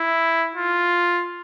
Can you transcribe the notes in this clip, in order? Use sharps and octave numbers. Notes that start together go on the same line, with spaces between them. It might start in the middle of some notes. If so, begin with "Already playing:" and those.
Already playing: E4
F4